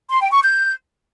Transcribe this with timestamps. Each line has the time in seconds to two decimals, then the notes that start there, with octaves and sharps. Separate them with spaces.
0.10 C6
0.21 G5
0.31 C#6
0.42 G6